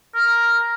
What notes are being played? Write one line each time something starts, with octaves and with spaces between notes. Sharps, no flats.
A#4